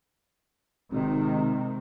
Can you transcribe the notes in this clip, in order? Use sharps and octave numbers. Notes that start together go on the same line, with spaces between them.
G#1 C3 D#3